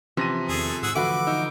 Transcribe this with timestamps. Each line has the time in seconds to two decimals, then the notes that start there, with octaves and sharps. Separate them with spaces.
0.17 C3 E3 F3 C#4 A#6 D#7
0.49 E2 D#3 A3 G#4
0.83 G#2 G#4 F#5 E6
0.95 D3 E3 F3 A3 F#4 B4 D6
1.27 D#4 E6